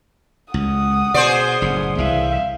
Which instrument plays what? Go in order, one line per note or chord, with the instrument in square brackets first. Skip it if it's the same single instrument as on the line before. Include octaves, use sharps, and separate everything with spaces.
[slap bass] C#2 [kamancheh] F#5 D#6
[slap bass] B2 [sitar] G#4 C5 D5
[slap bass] F#1 A2
[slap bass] C2 E3 [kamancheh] E5 F5